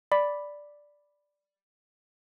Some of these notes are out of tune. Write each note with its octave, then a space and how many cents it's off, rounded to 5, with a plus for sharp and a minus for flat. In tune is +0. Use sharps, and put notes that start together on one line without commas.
D5 +0 B5 +0